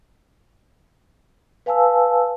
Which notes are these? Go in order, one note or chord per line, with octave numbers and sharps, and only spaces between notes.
B4 F5 G#5 A5 E6